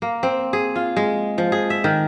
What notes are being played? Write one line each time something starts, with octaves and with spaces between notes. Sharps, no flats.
A#3
C4
G#4
F4
G#3
F3
G#4
E5
D#3